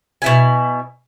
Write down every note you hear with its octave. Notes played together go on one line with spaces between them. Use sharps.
B2 E4 G#5